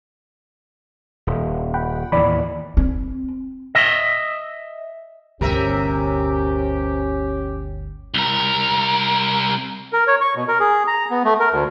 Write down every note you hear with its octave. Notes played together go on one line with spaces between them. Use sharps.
D#1
F#5 G5 B5
D#2 A2 E3 D5 B5
C4
D#5 E5
G1 D2 C3 C#4 G4 A#4 E5
C2 A#4
A#4
C#5
C#6
B2
A#4
G#4
A#5
B3
A3
A#4
D2